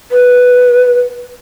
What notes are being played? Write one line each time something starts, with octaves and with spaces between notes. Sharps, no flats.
B4